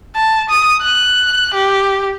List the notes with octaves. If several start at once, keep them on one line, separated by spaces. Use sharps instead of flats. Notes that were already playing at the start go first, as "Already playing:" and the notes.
A5
D#6
F#6
G4